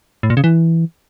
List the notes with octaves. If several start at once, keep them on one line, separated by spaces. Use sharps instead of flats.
A2
A#2
C#3
E3